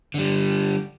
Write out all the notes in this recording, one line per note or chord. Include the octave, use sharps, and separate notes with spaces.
D3 G3